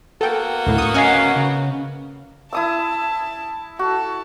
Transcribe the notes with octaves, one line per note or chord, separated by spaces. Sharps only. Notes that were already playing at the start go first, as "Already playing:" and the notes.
A#3 B3 F#4 A4 G5
D2 A2
C#6 D#6
C#4 D#5 F5 F#5 G#5
C#3
E4 A5 D#6 E6
F#4 A4